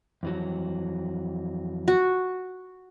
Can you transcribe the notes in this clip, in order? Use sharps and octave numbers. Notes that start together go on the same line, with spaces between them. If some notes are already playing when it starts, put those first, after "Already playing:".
F2 E3 F#3
F#4